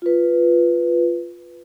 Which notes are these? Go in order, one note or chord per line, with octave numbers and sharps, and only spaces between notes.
F4 B4